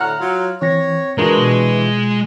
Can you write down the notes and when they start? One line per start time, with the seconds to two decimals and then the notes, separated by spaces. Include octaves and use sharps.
0.01 A2 D3 F#5 A#5 F6
0.21 F#3 F4
0.62 E3 C4 C#5 A#6
1.18 E3 G#3 D4 F4 F#4 A#4
1.38 B2
1.85 F4